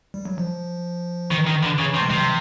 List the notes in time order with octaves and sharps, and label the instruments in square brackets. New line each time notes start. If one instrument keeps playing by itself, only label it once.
[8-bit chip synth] G3
F#3
F3
[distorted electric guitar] D#3 [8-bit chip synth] E3
[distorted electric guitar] D#3
D3
C#3
C3
[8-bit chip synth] G#3
[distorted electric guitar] C3 [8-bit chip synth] G3
[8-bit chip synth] F#3